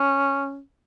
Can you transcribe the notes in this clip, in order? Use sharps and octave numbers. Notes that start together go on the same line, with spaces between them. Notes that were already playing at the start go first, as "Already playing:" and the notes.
Already playing: C#4